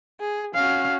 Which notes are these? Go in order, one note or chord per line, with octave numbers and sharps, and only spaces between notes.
G#4
C#4 F#4 F5